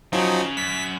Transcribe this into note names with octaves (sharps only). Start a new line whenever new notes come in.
C#3 F3 F#3 D#4
F#2 B6